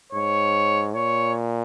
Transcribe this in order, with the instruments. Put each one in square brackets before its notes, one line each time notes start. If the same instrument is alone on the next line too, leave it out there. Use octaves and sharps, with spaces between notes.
[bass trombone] G#2 [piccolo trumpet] C#5
[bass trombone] A#2 [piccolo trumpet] C#5